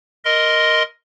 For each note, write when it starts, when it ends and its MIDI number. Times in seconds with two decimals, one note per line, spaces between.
0.25 0.83 70
0.25 0.83 75
0.25 0.83 84